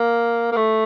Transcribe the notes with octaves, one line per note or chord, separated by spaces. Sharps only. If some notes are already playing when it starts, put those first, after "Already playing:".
Already playing: A#3
A#3
A3